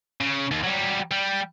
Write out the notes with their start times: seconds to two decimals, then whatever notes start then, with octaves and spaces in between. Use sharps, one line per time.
0.21 C#3
0.52 D#2
0.64 F#3 G3
1.11 G3